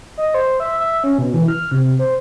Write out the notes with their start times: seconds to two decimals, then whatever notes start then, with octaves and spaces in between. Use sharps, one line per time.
0.18 D#5
0.34 C5
0.60 E5
0.80 E5
1.04 C#4
1.19 B2
1.34 E3
1.48 F6
1.71 C3
1.99 C5